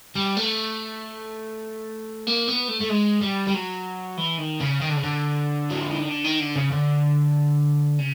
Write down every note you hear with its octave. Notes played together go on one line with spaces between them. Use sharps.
G3
A3
A#3
B3
A3
A3
G#3
G3
G3
F#3
E3
D#3
C#3
D#3
D3
C#3
D3
F#3
F3
E3
D#3
D3
D#3
D3
C#3
D3
C#3